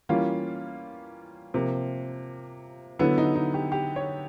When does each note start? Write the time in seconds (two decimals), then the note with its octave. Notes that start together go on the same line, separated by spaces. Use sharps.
0.09 E3 G3 A#3 C#4 F4
1.54 C3 F3 A#3
2.99 D3 F#3 B3 E4
3.18 D#4
3.35 D#4
3.54 G4
3.72 G4
3.96 C#5